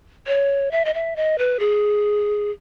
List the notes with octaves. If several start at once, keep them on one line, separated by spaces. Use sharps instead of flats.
C#5
E5
D#5
E5
D#5
B4
G#4